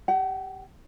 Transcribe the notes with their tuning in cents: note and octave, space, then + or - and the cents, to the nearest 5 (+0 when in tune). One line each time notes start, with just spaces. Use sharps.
G4 +10 F#5 +35